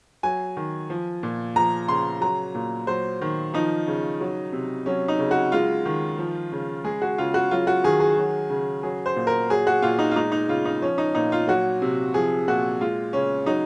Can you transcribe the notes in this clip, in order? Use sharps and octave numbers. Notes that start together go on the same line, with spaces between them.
F#3 G#5
D#3
F3
A#2
F3 A#5
C#3 C6
F#3 A#5
A#2
F#3 C5
D#3
F3 D#4
C#3
F#3
C3
F#3 C#4
D#4
C#3
F#4
G#3 F4
D#3
F3
C#3
G#3 G#4
F#4
C#3 F4
F#4
F#3 F4
F#4
D#3 G#4
G#4
F#3
C#3
F#3 G#4
C5
A#2
A#4
F#3 G#4
F#4
A#2 F4
D#4
F4
G#3 D#4
D#4
C#3 F4
D#4
F3 C#4
D#4
A#2 D#4
F4
F#3 F#4
C3
F3 G#4
A#2 F#4
G#3 F4
C#3 C#4
F#3 D#4